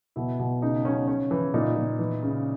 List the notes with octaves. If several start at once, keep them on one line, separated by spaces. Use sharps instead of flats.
B2 E4
B2
C#3 D#4
C#3 C#4
C#3 C#4
E3
A#2 D#4
A#2
E3
C#3